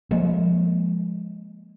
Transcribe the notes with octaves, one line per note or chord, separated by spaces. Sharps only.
F3 G#3 A#3